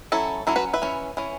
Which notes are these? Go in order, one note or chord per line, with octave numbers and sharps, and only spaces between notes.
F#3 C#4 E4 A4
F#3 C#4 E4 A4
F#4 B4
B4 E5
E3 C#4
E3 C#4